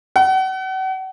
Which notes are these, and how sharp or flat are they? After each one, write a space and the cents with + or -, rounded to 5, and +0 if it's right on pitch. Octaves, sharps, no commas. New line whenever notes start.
F#5 +40